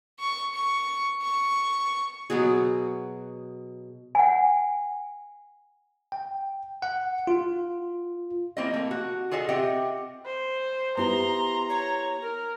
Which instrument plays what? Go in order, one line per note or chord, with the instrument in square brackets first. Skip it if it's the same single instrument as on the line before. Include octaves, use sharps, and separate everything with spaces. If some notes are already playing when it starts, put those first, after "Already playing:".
[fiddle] C#6
C#6
C#6
[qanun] B2 F#3 F#4 G#4
[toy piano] F#5 G#5
[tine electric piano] G5
F#5
F4
[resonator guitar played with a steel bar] F3 A#3 C4 E4 D#5
A3 A#3
F#4
F4 G#4 A4 D#5
C4 F4 G4 D#5 E5 F#5
[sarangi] C5
[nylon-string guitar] B3 E4 G4 [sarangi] A#5 [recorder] C6
[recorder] C#5
A#4